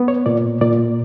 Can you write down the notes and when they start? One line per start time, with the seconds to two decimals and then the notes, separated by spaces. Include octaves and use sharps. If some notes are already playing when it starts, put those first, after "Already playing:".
Already playing: B3
0.08 C#5
0.26 A#2 D5
0.61 A#2 D5